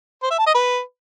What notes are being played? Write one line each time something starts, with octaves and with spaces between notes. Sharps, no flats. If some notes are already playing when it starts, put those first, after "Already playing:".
C5
E5
A5
D#5
B4